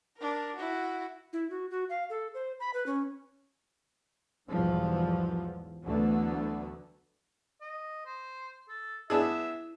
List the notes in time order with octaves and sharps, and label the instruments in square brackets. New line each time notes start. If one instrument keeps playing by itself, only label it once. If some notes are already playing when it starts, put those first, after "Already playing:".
[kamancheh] D4 A#4
E4 F#4
[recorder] E4
F#4
F#4
F5
A4
C5
B5
B4
C#4
[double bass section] B1 E2 G#2 E3 F3 G3
D2 D3 E3 F#3 A3 B3
[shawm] D#5
C5
A4
[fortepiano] B3 D4 G#4 [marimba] E4 [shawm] E5